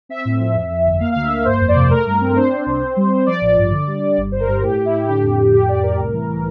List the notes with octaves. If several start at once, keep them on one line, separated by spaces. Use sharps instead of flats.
C4 E5
A2
F3
F2
F2
G1
A#3 F5
D2 F5
E5
A#3
G1 C5
F2
D5
C3
A3 A#4
G2
C4
D4 C5
D4
C2
C4
G3
G3
F3 D5
A1
G2
D3
G3
G3
G1
G1 C5
A#4
G2
A2 G4
A2
E4
A2
D3 G4
F2
F2
A2 G4
A2 D5
A2 A#4
C2
E3
E3